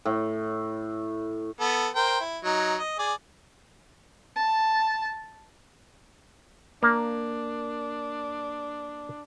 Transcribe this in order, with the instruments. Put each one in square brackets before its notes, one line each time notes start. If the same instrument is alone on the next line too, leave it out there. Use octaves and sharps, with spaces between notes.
[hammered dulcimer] A2
[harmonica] B3 A4
A#4 C5 G5
E4
F#3 D#4
D#5
G#4 D5
[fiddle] A5
[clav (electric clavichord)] A#3 [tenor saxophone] D4